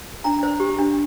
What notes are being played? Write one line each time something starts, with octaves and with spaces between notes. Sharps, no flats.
D4 A#5
C5
G4
D4